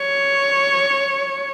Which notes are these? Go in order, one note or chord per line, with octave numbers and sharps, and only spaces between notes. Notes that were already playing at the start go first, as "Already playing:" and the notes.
Already playing: C#5